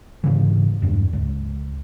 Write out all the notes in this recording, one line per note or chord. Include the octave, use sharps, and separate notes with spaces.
G#2 C#3 E3
E1 G2
C#2